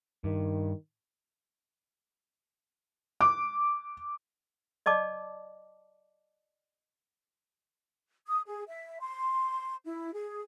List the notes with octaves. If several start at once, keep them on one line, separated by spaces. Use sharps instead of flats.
G2 D#3
D6
D5 D#5 A5 D6
D#6
G#4
E5
C6
E4
G#4